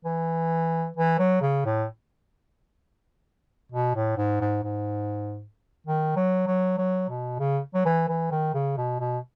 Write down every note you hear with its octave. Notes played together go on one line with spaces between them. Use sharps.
E3
E3
F#3
C#3
A2
B2
A2
G#2
G#2
G#2
D#3
F#3
F#3
F#3
B2
C#3
F#3
E3
E3
D#3
C#3
B2
B2